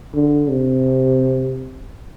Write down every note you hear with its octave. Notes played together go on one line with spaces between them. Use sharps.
D3
C3